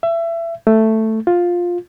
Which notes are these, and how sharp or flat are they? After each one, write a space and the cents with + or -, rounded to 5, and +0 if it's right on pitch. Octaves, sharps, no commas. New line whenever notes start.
E5 +25
A3 +5
F4 +10